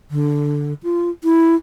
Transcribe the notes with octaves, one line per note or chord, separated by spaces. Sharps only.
D3
F4
E4